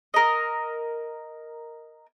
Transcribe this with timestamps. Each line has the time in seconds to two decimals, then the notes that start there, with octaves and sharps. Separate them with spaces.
0.14 A#4 D#5